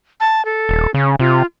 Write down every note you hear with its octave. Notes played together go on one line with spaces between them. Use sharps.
A5
A4
D#1
C#3 C#4
C3 F4